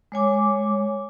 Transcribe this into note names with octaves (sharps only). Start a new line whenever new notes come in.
G#3 C#5 G#5 D6